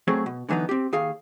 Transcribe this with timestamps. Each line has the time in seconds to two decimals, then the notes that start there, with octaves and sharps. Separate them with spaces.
0.08 F#3 A3 C4 G#4
0.26 B2
0.49 D3 E3 F#3 B3 D#4
0.69 C4 G4
0.93 D#2 G#4 F5